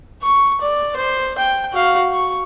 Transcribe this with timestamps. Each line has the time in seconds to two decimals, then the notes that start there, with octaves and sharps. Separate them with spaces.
0.23 C#6
0.61 D5
0.96 C5
1.38 G5
1.73 F#4 F5
2.13 C#6